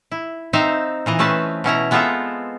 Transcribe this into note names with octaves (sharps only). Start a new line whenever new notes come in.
E4
C4 D#4 C5 E5 F5
A#2 E3 D#5
A3 C4 C#4 B4 A5
B2 C#4 E4 A#5
G#3 B3 C4 F4 A4 E5